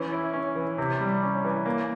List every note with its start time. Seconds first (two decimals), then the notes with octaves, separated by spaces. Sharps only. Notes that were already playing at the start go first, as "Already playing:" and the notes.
Already playing: E3 C#4
0.13 E4
0.33 C#4
0.55 E3
0.78 C3
1.00 G3
1.23 C#4
1.45 E3
1.66 A#3